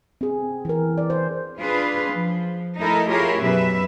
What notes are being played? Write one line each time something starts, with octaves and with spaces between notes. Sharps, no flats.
C4 G#4
E3 A#4
D5
C5
D4 F4 G#4 B4
F3
A3 D#4 E4 A4 A#4
E4 F4 G4 G#4 A#4 C#5
F#2 B2 B4 E5